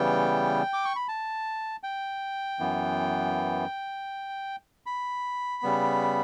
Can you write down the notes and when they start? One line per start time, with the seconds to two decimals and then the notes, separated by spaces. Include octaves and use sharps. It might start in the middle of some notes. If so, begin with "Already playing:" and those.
Already playing: C#3 E3 G3 B3 G5
0.73 D6
0.85 C#6
0.96 B5
1.08 A5
1.83 G5
2.60 F#2 E3 B3
4.86 B5
5.63 C#3 G3 B3